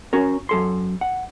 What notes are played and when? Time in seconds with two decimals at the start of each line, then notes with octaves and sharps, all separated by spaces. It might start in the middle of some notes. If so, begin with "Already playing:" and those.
0.13 C#4 F#4 A#4
0.49 F#2 A4 C6
1.01 F#5